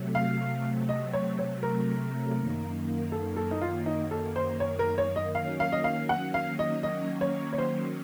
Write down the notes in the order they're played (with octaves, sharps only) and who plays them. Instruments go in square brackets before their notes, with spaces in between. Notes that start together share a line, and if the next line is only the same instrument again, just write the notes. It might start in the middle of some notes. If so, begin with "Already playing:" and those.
Already playing: [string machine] C3 F#3 A3
[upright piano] F5
D#5
C#5
C#5
A#4
[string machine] F#2 D#3 A#3
[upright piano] A4
A4
D#4
F4
D#4
A4
C5
C#5
A#4
C#5
D#5
[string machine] D#3 F#3 A#3 C#4 [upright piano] F5
[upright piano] F5
D#5
F5
F#5
F5
D#5
D#5
C#5
C#5
C5